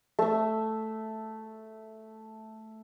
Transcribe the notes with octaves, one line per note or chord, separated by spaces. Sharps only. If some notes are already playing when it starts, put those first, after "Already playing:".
A3 E5